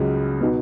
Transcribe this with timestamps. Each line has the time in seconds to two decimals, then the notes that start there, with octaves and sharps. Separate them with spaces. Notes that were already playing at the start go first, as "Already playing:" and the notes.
Already playing: C#2 C#3 F#3
0.40 B2 B3 D#4 F#4